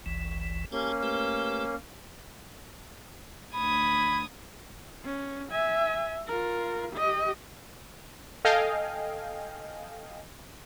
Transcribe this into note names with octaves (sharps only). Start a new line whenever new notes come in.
G1 C#2 E3
A#3 C#4 G4 G#5 A5
A3 G4 B4
D2 B5 D#6 G#6
C#4
E5 G#5
F4 A#4
G4 D#5
A4 D#5 F5 G5 G#5